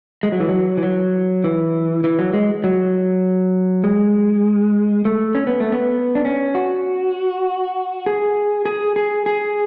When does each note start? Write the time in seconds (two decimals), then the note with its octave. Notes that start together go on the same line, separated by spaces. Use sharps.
0.23 G#3
0.32 F#3
0.40 E3
0.49 F#3
0.77 E3
0.83 F#3
1.44 E3
2.04 E3
2.19 F#3
2.33 G#3
2.64 F#3
3.84 G#3
5.05 A3
5.35 C#4
5.47 B3
5.60 A3
5.72 B3
6.15 D4
6.25 C#4
6.55 F#4
8.06 G#4
8.65 G#4
8.96 G#4
9.26 G#4